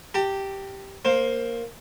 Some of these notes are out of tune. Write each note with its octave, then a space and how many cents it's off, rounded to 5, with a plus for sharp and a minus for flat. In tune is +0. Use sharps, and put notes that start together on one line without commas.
G4 -5 A5 +45
A#3 +0 C5 +15